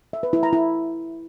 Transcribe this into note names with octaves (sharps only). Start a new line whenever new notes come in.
E5
B4
E4
A#5
E4